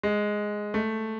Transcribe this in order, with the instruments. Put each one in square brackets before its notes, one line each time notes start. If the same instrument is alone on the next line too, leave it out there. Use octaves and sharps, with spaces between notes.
[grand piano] G#3
A3